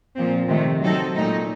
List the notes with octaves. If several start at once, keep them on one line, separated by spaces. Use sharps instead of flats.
A#2 F3 C4
C3 D#3 A3
F#3 C4 D#4 A4
A#2 A3 D#4